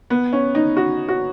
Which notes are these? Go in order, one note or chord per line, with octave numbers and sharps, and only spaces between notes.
B3
C#4
D#4
F#4
F#4